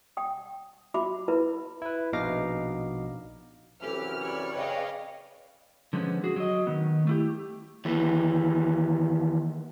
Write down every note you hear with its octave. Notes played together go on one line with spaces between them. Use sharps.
G5 D#6
F4 F#4 E5 B5 D6
E4 F4 A#4 B4 B5
E4 B4
A#1 B2 D#4 F5 D6 A#6
F#2 C3 E3 G4 A4 F6
C#5 D5 B5
C#3 B4 D#5 F5 G5
D3 F3 G#3 B3 C#4
F#4 G#4
F#3 D#5
D#3 B3
A3 E4 G4
D#2 E3